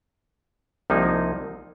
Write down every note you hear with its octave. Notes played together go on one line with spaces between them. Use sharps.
C2 C3 F3 A#3 D#4